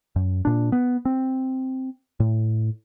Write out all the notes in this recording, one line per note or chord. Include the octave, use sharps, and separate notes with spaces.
F#2
A#2 D4
B3
C4
A2